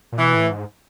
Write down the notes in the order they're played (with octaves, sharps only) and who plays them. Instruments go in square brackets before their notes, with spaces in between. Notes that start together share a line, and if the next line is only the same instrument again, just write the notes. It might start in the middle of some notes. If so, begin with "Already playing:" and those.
[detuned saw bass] A#2
[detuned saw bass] B2 [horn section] E3
[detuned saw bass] A2
G#2